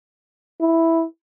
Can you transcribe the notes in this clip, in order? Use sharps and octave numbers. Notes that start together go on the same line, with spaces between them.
E4